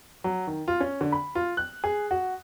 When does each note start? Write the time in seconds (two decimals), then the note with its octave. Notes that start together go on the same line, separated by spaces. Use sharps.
0.24 F#3
0.47 D#3
0.68 F4
0.80 C#4
1.01 D3
1.12 B5
1.35 F4
1.57 F#6
1.84 G#4
2.11 F#4